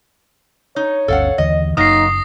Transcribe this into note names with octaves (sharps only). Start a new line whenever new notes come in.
D#4 C#5
G1 D2 C#4 A4 F5 F#5
D#2 D3 E3 D#5
F#1 F#3 A#3 D#4 D#6 A#6 C7